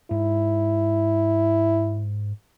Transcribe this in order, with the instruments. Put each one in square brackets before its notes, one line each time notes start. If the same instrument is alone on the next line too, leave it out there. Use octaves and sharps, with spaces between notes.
[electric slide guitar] G#2 [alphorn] E4